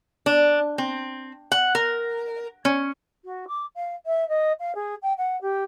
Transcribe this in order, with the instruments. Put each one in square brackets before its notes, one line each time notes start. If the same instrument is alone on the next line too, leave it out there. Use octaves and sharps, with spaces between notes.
[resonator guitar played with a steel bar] D4
C4
F#5
A#4
C#4
[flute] F#4
D6
F5
E5
D#5
F5
G#4
G5
F#5
G4